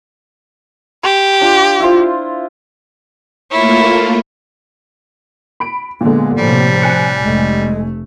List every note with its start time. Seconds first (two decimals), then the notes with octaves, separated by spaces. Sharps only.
1.04 G4 C6
1.41 D4 F4
1.80 E4 F4 C5
3.51 A3 A#3 E4 F4 C#5
5.60 B5 D7
6.01 A#2 D3 G#3 B3
6.38 A2 C3 F3 G3
6.82 G#5 F#6 C#7
7.23 F1 G#3 A3